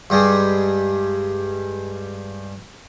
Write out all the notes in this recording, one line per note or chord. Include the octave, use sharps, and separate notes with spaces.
G2 G3 G#3